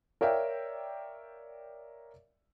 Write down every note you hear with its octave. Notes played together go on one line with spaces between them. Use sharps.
A#4 C#5 D5 E5 F5 G5